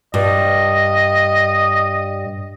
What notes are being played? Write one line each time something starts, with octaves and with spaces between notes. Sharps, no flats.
G2 D#5